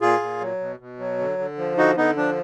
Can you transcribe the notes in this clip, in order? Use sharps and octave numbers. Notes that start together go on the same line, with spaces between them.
A#2 F4 G#4
A#2
F#3
B2
B2
F#3
D3
D3
F3
D3 D#4 F#4
D3 B3 D#4
F3 D4